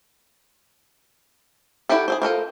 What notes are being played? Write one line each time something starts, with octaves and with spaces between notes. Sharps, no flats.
D4 E4 F#4 G4 A4
G#4 A4 C5
F4 A4 A#4 C5